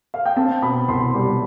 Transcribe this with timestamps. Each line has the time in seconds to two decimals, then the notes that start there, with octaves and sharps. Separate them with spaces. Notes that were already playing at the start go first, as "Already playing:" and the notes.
0.14 F5
0.25 G5
0.36 C4 A5
0.62 B2 B5
0.88 C2 C6
1.14 G3